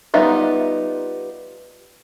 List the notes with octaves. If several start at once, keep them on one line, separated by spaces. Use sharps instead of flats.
G3 B3 D#4 F4 E5